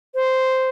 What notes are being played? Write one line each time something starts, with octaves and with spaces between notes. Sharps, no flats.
C5